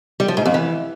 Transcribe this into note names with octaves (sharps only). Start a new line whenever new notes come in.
G3
F3
G#2
F2
E3